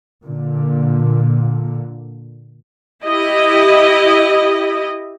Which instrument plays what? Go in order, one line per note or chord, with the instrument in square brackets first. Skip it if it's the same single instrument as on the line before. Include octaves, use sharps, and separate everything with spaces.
[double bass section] A#2 D3
[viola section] E4 G4 D#5